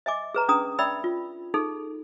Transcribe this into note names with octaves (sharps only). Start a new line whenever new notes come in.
D#5 E5 G#5 D6
G#4 B4 A#5
C#4 D4 G#4 A#5 D#6
D5 E5 G5 B5 E6
F4
D#4 G#4 A4